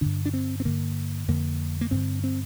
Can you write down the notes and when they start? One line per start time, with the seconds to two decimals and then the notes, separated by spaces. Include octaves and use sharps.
0.01 G2 D3 D4
0.26 D4
0.34 C4
0.60 C4
0.65 G2 D3 A#3
1.28 F2 D3 A#3
1.81 A#3
1.91 G2 D3 C4
2.24 C4